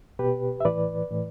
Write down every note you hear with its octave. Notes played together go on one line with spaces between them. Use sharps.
B2 G4 B4
E5
A2 E3 B4 D5
A2 E3